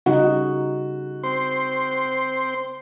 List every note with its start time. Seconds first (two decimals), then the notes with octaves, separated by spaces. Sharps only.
0.06 C#3 G3 D#4 F#4
1.23 C4 C5